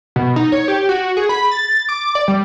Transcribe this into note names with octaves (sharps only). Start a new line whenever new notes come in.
B2
D#4
C#5
G4
F#4
G#4
B5
A6
D6
D5
G3